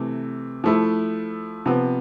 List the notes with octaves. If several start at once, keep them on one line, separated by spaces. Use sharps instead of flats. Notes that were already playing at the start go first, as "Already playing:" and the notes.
Already playing: C3 E3 A3
F3 A3 E4
C3 F3 B3